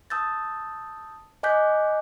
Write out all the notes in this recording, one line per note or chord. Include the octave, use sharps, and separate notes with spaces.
A5 D#6 E6 G6 A6
D#5 G#5 D6 F#6 G6 B6